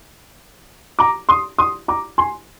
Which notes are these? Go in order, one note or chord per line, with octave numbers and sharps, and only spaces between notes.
A#5 D6
C6 D#6
C6 D#6
A#5 D6
G#5 C6